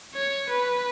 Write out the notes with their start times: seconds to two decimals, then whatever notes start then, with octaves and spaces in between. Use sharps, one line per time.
0.14 C#5
0.49 B4